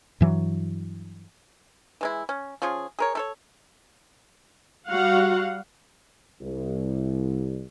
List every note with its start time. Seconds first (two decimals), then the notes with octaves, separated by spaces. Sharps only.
0.21 G2 E3 F#3
2.01 E3 G#3 E4
2.29 C#4
2.62 F3 C#4 F4 G#4
2.99 G#4 A#4 C#5
3.15 A3 A4 C#5
4.88 G3 F#4 F5 F#5
6.41 C2